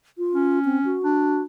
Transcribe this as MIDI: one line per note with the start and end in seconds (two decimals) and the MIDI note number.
0.18 0.59 65
0.34 0.98 61
0.65 0.79 60
0.85 1.42 66
1.04 1.44 62